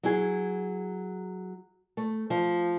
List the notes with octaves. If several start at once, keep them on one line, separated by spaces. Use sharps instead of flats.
F#3 E4 G#4
A3
F3